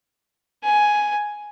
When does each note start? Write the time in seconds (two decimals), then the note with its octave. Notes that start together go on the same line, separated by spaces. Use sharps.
0.64 G#5